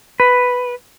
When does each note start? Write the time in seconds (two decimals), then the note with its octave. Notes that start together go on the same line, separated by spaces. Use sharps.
0.20 B4